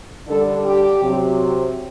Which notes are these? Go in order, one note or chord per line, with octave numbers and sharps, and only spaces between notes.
D3 G3 D4 A4
G4
C3 F#3 C4